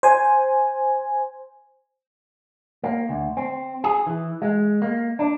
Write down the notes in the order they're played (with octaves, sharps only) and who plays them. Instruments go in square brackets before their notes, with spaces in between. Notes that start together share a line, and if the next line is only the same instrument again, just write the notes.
[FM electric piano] C5 G#5
[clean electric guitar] A#3
D2
C4
G#4
E3
G#3
A#3
D4